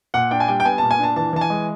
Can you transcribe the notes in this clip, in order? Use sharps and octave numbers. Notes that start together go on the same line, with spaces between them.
A#2 F#5
D4 G5
G#5
G3 G5
G5
B3 G#5
A#2 A5
G#5
D4 A5
E3 A5
E3 A5
G#5
G#3